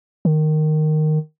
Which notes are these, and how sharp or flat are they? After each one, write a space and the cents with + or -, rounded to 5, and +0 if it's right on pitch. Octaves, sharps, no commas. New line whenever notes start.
D#3 -10